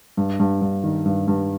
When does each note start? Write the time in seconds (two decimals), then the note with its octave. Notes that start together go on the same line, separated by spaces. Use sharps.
0.17 G2
0.40 G2
0.62 G2
0.84 D#3
1.06 G2
1.28 G2